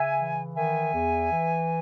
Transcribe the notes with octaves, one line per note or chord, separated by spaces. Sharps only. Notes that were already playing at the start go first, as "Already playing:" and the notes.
Already playing: C#3 E5 G#5
E3
D#3 E5 G#5
E2
E3